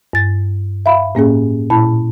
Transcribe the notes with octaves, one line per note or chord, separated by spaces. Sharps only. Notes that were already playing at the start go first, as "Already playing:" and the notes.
G2 A6
E5 F5 B5
A2 A#3 C#4 G#4
A#2 E4 A5 B5